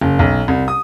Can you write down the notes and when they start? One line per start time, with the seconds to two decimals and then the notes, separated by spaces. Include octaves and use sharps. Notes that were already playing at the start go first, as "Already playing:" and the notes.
0.01 F#1
0.19 B1
0.48 C2
0.68 D#6